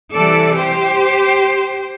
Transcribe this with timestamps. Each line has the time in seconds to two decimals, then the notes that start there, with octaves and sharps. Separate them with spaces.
0.13 C3 E3 G3 A4 D5
0.56 G4 C5